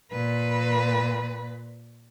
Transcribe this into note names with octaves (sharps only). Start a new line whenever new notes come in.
A#2 B4